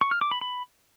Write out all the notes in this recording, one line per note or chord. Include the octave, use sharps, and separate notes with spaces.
C#6
F6
D6
B5
B5